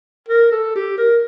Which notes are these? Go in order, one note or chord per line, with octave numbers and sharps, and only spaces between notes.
A#4
A4
G4
A#4